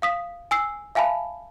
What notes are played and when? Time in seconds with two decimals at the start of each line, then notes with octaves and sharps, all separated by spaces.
0.02 F5 D#6 B6
0.51 G#5 E6 C7
0.95 E5 F5 G#5 A5 B5